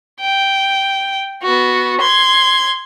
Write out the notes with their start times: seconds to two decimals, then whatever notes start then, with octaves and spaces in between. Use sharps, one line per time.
0.20 G5
1.43 B3 F#4
2.01 C6 G#6